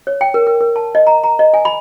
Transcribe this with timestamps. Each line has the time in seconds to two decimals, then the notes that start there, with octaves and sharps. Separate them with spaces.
0.07 C#5
0.21 G5
0.34 A#4
0.47 A#4
0.61 A#4
0.76 A5
0.95 D#5
1.07 A#5
1.24 A#5
1.39 D#5
1.54 G#5
1.65 B5